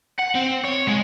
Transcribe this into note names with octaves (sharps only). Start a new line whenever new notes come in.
F#5
C4
C#5
G#3